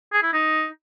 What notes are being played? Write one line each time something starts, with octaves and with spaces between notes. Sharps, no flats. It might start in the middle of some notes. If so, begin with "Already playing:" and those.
G#4
E4
D#4